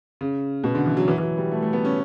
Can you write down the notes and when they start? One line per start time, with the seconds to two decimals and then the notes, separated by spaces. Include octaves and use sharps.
0.21 C#3
0.64 B2
0.75 D3
0.86 E3
0.97 F#3
1.08 E3
1.18 E3
1.23 F#3
1.37 G3
1.51 A3
1.62 A3
1.73 B3
1.85 C#4